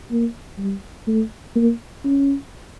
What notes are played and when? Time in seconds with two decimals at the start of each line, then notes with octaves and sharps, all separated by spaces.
0.11 A#3
0.58 G3
1.07 A3
1.56 A#3
2.04 C#4